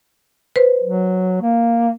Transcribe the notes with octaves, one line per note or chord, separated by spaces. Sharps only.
B4 C5
F#3
A#3